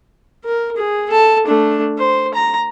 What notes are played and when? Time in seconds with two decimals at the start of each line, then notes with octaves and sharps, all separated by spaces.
0.44 A#4
0.76 G#4
1.10 A4 A5
1.47 A3 D4
1.98 C5
2.34 A#5